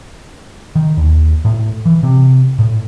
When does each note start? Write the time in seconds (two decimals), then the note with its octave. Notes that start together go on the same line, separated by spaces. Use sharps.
0.75 D#3
0.97 D#2
1.45 A2
1.86 E3
2.03 C3
2.59 A2